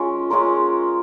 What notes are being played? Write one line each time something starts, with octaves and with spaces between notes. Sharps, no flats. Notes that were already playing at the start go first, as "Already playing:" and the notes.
Already playing: G#3 C#4 F4 A#4
G#3 C#4 F4 A#4